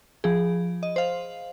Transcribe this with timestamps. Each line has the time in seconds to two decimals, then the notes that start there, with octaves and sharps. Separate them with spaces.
0.24 F3 G#4
0.83 D#5
0.96 C5 F5